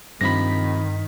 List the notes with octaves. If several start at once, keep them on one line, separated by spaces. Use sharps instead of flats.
G2 C3 D#3 F3 B5 A#6 B6